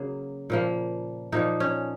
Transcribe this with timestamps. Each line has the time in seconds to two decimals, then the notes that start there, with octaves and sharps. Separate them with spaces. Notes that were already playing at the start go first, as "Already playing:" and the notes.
Already playing: C#3 F#3 A#3
0.50 A#2 F3 A#3
1.32 A#2 F3 A#3 D#4
1.60 C#4